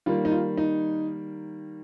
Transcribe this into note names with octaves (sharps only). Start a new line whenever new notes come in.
D#3 G3 A#3 F4
D#4
F4
D#4